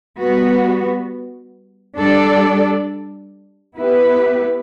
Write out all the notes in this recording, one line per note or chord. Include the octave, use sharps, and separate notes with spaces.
G3 B3 F#4
G3 D4 A4 D5
B3 E4 G4 B4